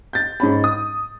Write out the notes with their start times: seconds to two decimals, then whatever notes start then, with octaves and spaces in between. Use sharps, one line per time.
0.13 G6 A6
0.40 G#2 C#4 B5
0.64 D#6